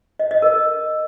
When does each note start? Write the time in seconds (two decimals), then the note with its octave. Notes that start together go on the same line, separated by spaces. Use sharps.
0.19 D#5
0.31 D#5
0.42 A#4